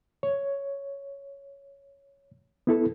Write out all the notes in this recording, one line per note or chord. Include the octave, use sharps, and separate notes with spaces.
C#5
B3 E4 A4